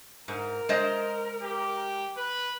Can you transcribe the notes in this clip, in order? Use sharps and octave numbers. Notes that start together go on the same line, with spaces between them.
G#2 A#4
G#3 C5 D#5
G4
B4